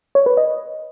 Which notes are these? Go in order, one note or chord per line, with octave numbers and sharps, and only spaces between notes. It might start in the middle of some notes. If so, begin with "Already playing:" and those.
C#5
B4
D#5